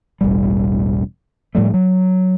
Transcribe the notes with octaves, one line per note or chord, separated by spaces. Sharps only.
E1 A1 G3
A2 F3 G3 A3
F#3